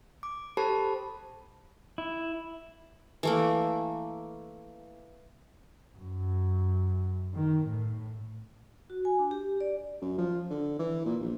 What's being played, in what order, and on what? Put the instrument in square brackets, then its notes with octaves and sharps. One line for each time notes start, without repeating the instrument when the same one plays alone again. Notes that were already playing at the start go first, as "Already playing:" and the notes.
[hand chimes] D6
G4 A4 C5 A5 B5
[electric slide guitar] E4
[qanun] E3 A3 A#3
[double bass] F#2
D#3
A2
[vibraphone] F#4
G#5
D4
G4
D5
[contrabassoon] F#2
F3
D3
E3
A#2
A#1